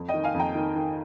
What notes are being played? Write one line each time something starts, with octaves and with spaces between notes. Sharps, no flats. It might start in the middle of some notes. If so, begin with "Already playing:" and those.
Already playing: F2
D#5 G5
D#3
F5 G#5
F2
G5 A#5
D#3
D#3